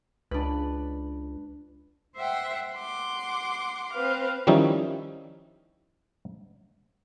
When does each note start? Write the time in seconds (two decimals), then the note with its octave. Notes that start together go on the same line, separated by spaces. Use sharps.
0.31 C#2 D4 B4
2.15 C5 E5 F#5 G5
2.77 F#5 C6 D6
3.93 C4 B4 F5
4.47 D#3 F3 G3 C#4 D#4 E4